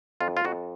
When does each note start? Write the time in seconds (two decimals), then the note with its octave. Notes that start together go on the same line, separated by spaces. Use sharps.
0.21 F2 F4
0.37 F4
0.45 F2 F#4